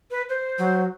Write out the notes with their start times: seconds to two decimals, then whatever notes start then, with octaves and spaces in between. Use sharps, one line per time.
0.11 B4
0.29 C5
0.58 F#3